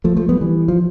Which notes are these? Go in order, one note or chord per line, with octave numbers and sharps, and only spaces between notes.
F3 A3
F3 A3
G3 B3
E3 G3
F3